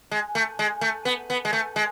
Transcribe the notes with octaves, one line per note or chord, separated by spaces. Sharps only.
G#3
A3
G#3
A3
B3
B3
G#3
A3
G#3